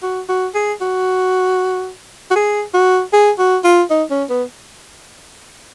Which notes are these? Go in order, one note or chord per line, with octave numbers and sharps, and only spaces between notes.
F#4
F#4
G#4
F#4
F#4
G#4
F#4
G#4
F#4
F4
D#4
C#4
B3